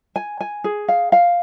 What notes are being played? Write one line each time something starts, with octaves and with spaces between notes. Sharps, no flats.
G#5
G#5
G#4
F5
F5